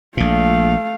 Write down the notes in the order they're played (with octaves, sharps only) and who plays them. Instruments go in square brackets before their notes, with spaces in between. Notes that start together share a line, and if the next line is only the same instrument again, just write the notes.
[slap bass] A#1 A#2 [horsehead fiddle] A3 F5